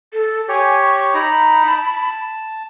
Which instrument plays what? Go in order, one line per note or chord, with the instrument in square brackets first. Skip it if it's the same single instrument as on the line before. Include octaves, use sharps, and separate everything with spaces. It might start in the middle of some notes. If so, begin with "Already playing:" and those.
[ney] A4
[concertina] G4 C#5 [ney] G#5
[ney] C#6
[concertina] D#4 A#5 [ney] B5
[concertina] A5